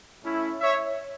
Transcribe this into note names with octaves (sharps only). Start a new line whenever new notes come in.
A3 C#4 E4
C#5 E5